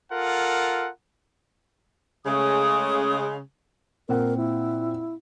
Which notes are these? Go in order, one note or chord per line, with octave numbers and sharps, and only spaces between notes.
F4 A4 A#4 F#5
C#3 G#3 A3 D#6
A#2 C4 A#4 F#5
E4